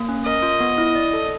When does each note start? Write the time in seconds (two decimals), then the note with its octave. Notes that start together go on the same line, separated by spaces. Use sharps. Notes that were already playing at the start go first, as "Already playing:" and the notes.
Already playing: A#3
0.09 C#4
0.25 A#4 D#5
0.42 F4
0.60 B3
0.78 E4
0.95 D5
1.13 A4